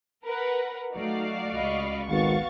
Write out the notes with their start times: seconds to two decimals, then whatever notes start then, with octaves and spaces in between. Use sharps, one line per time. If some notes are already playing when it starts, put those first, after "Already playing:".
0.25 A#4 B4 F#5
0.93 F#3 A3 D#4 F#4 D5 F5
1.54 C#2 D#5 B5 C#6
2.09 G#1 B3 F#4 F5 C#6 A6